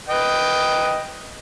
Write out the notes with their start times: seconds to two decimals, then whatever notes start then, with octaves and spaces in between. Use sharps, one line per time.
0.09 B4 D#5 G5